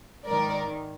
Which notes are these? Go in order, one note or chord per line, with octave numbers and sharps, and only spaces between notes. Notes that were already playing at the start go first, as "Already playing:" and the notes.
G#2 D#3 A#4 D5